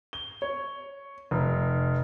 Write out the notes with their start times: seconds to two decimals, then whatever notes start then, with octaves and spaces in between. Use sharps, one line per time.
0.13 G7
0.42 C#5
1.31 F1